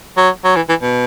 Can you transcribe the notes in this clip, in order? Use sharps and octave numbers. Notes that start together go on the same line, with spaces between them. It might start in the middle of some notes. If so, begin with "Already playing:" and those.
F#3
F#3
E3
E3
B2